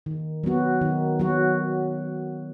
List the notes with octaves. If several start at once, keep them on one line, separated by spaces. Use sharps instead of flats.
D#3
F#3 B3 F#4
D#3
F#3 B3 F#4